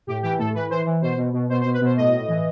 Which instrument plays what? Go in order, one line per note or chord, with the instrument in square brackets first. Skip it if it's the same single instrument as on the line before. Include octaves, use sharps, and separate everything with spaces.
[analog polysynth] A2 G4
E3 G4
A2 A4
E3 B4
E3 C5
E3
B2 C5
B2
B2
B2 C5
C5
B2
B4
B2 C5
A2 D#5
A2
E3